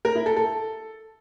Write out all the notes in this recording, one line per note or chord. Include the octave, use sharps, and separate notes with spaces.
A#4
E4
A4
A4